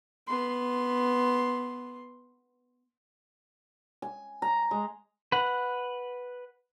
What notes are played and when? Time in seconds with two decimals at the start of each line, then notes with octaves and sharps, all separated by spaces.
0.27 B3 C6
4.02 G#5
4.42 A#5
4.71 G#3
5.32 B4 F#5